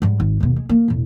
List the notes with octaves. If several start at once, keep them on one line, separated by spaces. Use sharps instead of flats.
G#2 G3
G#1
D#2 B2
G#3
A#3
E1 A2